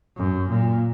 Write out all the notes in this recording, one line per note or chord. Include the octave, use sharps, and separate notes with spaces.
F#2
A#2